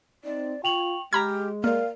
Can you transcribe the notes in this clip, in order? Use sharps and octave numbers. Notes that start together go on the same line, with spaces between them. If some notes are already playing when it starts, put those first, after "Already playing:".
C4 D#4 D5
F4 G5 C#6 F7 F#7
G#3 G4 A#5 B5 F6 G#6
A#3 A#4 D5 F5 F6